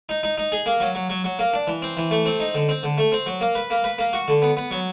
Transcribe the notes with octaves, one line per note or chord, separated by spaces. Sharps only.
D#4
D#4
D#4
G#4
A#3
F#3
F#3
F#3
F#3
A#3
D4
E3
C4
E3
A3
C4
D#4
D3
C4
D3
A3
C4
F#3
A#3
B4
A#3
B4
A#3
F#4
D3
B3
B3
F#3